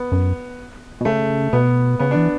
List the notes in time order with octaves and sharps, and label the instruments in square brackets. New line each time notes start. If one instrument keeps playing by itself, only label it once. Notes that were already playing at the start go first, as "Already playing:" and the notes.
Already playing: [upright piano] B3
[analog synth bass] F#2
B2
[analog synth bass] C#3 [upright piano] A3
[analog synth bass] B2 [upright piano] B3
[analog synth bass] C#3 [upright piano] B3
[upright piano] D4
[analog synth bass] E3